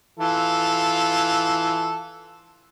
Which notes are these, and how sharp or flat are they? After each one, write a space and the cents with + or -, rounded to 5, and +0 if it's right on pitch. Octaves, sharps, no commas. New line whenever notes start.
E3 +0 F4 +0 A4 -10